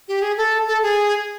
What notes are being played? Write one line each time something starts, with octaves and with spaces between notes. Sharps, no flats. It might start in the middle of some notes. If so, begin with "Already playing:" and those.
G4
G#4
A4
A4
G#4